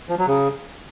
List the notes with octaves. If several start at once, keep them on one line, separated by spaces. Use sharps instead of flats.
F3
F#3
C#3